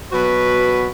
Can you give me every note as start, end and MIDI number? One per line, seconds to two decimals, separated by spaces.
0.12 0.89 47
0.12 0.89 54
0.12 0.89 66
0.12 0.89 71